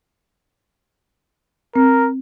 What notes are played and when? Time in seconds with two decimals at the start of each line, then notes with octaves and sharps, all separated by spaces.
1.76 C4 A#4